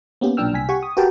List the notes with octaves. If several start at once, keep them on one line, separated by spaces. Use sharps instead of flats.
A#3 B3 C#4 G4
B1 A#2 D4 G5 E6 F6
C2 G#5 B6
G4 F#5 G#5 C#6
D#6
F#4 G4 A#4 B4 G5 A5